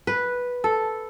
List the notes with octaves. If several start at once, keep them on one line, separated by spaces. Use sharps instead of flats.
B4
A4